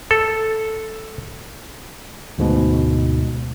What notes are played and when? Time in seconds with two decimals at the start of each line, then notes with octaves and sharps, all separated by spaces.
0.11 A4
2.38 D2 G#2 B2